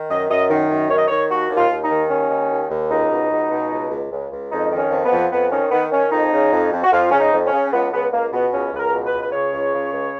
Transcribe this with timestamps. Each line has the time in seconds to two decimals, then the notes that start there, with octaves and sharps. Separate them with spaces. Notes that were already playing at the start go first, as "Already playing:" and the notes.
Already playing: D#3
0.09 F#2 D#5
0.30 F#2 D#5
0.50 D#3
0.70 F#2
0.90 D#3 C#5
0.98 D#5
1.08 D#3 C#5
1.30 D#2 F#4
1.50 D#2
1.57 F4
1.70 D#2
1.84 D#4
1.90 D#3
2.10 D#2 C#4
2.30 D#3
2.51 D#2
2.70 D#2
2.91 C#2 D#4
3.10 B2
3.31 C#2
3.51 B2
3.71 C#2
3.91 C#2
4.12 C#2
4.32 C#2
4.51 F2 D#4
4.71 D#3
4.78 C#4
4.91 F2
5.05 B3
5.12 F2
5.32 F2 B3
5.51 D#3 C#4
5.71 D#3 B3
5.92 D#3 C#4
6.11 F2 D#4
6.32 C#3
6.53 F2
6.72 F2
6.84 F#4
6.92 F2 F4
7.11 C#3 C#4
7.20 D#4
7.32 F2
7.46 C#4
7.53 C#3
7.67 C#4
7.73 C#2 B3
7.92 C#2 B3
8.12 C#2 A#3
8.33 B2 B3
8.52 C#2 C#4
8.73 C#2 B4
8.79 A#4
8.93 B2
9.06 B4
9.13 C#2
9.23 B4
9.33 C#3 C#5
9.53 C#2
9.74 C#3
9.93 C#2